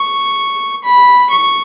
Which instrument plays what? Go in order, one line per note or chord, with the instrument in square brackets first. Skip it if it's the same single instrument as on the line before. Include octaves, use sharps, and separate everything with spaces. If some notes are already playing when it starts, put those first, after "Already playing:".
Already playing: [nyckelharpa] C#6
B5
C#6